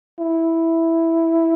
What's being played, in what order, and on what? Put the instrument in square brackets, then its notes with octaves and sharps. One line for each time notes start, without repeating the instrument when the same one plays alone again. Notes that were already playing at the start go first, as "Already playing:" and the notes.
[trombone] E4